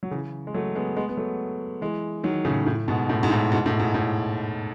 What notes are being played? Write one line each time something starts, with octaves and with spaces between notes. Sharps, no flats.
F#3
C#3 E3
G#3
F#3 A3
G#3 B3
G#3 B3
B3
F#3 A3
E3 G#3
D#3 F#3
A2 C#3
A2
G#2 B2
A2
G#2
A2
G#2 B2
A2
G#2
A2